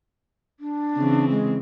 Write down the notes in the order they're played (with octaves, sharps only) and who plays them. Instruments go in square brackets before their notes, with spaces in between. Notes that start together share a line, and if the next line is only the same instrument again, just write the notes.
[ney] D4
[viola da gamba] C#3 E3 C4
[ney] G#3